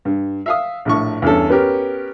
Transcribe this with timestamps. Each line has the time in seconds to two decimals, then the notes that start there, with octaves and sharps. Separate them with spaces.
0.05 G2
0.46 E5 F5 D#6
0.85 A#1 A2 C#6
1.22 E2 G2 C#4 A4
1.50 B3 C#4 G4 A#4